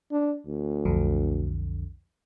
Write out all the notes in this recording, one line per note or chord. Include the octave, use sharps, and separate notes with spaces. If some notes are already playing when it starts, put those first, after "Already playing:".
D4
D2
B1 F2 D3